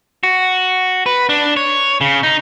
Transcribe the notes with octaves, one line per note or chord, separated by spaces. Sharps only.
F#4
B4
D4
C#5
C#3
D#4